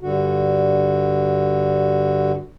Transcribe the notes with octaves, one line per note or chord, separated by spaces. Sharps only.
G2 D3 F#4